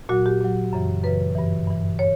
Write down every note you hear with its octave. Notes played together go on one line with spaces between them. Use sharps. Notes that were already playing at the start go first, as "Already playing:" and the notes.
A#2 F#3 F#4
G4
A#2 F#3
F#2 C#3 E3
F#2 C#3 E3 B4
G2 E3
G2 E3
C#5